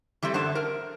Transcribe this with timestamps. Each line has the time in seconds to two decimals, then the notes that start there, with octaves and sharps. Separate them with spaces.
0.22 E3 G3 A3 C4
0.34 F#2 D3 C5 E5 A5
0.55 A#4